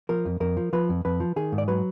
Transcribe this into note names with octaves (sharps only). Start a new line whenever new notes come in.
F3 A#4
F2
F2 A#4
F3
F3 B4
F2
F2 B4
F3
D#3 G#4
G#2
D5
F#3 B4